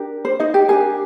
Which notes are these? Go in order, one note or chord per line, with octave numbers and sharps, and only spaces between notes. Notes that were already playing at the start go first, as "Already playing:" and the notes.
Already playing: D4 G4 A#4
C5
D#4 D#5
G4 G5
D4 G4 G#4 A#4 G#5